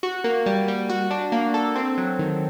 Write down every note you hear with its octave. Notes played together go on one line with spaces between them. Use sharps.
F#4
A#3
G3
G3
F#4
D4
A#3
A4
C4
F#3
D#3